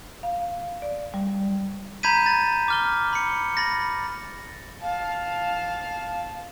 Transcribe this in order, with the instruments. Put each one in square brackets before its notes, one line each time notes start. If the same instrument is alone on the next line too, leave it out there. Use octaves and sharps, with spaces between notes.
[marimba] F5
D5
G3
[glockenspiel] A#5 B5 G6 G#6 B6 D#7
A6
D6 F6 G7
B5 C#7
B5 A6 A#6
[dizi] F5 [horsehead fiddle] A5